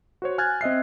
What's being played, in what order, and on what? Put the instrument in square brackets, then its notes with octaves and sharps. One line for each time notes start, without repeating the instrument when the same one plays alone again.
[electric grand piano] F#4 C5 C#5
G#5 F6 F#6 G#6 A6
C4 D#5 E5 C7